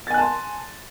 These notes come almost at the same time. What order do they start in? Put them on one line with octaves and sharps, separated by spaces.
A6 G#5 F#6 A5 C6